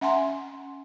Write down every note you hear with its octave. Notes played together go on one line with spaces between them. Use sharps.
C#4 E5 F#5 G#5 A#5 C6